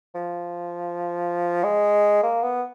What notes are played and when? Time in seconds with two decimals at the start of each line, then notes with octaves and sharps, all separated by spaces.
0.15 F3
1.63 G#3
2.23 A#3
2.43 B3